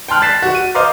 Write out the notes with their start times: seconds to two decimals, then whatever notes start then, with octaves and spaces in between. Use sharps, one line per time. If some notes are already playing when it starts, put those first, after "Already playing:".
0.08 G5 A5 C6 F6 F#6
0.22 A6 B6 C7 E7
0.42 F#4
0.55 D#7
0.75 C5 D#5 F5 A#5 C6 D6